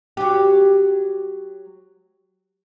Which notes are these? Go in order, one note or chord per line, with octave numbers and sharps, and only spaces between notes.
F#3 G4